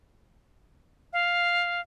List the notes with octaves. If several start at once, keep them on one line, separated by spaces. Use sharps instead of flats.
F5